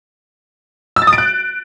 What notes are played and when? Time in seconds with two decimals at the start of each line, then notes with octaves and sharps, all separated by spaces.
0.96 E6
1.02 A6
1.07 D#6
1.13 D7
1.18 F#6